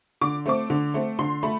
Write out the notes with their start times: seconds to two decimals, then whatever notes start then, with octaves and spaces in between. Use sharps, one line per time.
0.21 D3 D6
0.46 A3 C4 D6
0.70 D3
0.94 A3 C4
1.19 D3 C6
1.43 A3 B5